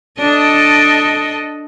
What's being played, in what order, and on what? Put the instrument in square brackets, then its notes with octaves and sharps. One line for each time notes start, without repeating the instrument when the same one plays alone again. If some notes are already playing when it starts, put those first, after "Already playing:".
[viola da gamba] D4 A4 D#5